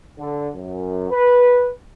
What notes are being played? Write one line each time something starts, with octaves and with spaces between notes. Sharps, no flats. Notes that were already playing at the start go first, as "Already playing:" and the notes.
D3
F#2
B4